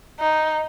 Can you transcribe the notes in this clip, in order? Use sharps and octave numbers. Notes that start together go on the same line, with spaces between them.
D#4